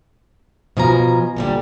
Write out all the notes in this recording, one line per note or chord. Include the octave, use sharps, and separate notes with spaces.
B2 F3 G#5 A#5
A#2 D3 G3